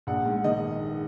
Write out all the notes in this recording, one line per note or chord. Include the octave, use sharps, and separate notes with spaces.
A#1 F#5
G#2
D#3 D#5